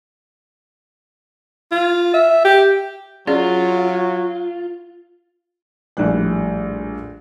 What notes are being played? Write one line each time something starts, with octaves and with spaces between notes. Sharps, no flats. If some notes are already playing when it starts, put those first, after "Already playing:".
F4
E5
G4
F#3 C#4 F4 G#4 D5
A#1 A2 G3 D5 F#6